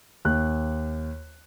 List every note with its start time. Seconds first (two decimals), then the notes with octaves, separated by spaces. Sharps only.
0.25 D#2 F#6